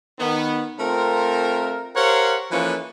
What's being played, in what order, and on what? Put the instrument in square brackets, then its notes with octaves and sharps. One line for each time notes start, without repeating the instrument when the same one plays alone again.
[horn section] D#3 B3
A3 C4 F4 A#4
G4 A#4 C5 C#5 F5 F#5
E3 F3 A#3 C#4 A4 B4